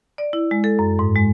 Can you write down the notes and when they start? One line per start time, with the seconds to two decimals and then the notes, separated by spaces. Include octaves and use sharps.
0.18 D5
0.33 E4
0.51 G#3
0.64 A4
0.79 F#2
0.99 G#2
1.16 G#3